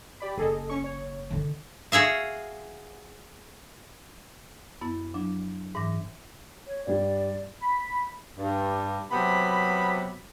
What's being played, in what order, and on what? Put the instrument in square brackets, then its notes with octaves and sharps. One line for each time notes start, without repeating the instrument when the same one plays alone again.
[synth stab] G4 D5 B5
[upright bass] F#1 [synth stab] G#4 A4 D#5
[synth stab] C#4 C#6
C#5
[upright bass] D3 D#3
[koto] F#4 G#4 E5 F5
[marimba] F#2 B3 E4
F3 F#3 D4
G#2 E3 D6 A#6
[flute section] C#5
[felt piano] G2 G3 [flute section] D5
[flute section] B5
[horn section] G2
C3 F#3 B3 B5